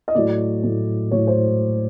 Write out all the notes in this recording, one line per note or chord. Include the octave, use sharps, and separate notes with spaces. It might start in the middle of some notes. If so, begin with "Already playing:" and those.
D#5
A2 F#3 D5
A2 F#3
A2 F#3 C#5
C5